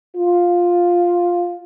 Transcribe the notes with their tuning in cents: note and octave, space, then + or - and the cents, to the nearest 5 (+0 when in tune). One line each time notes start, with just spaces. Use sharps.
F4 +5